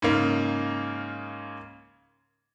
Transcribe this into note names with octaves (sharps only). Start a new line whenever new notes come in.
G#2 C#3 A#3